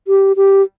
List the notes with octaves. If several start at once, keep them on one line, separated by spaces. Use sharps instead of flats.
G4
G4